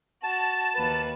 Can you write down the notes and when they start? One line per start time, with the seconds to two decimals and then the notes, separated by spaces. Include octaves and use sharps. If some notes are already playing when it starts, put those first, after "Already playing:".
0.24 F#4 A5
0.75 D#2 B4